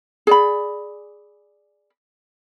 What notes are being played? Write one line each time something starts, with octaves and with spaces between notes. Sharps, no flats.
G#4 D5 B5